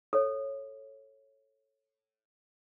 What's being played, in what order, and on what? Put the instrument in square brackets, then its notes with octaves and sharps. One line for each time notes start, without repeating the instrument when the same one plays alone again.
[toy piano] A4 C#5